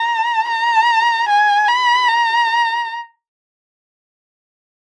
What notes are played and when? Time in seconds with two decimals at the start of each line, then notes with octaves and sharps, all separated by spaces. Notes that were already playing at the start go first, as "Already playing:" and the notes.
Already playing: A#5
0.48 A#5
1.28 G#5
1.68 B5
2.08 A#5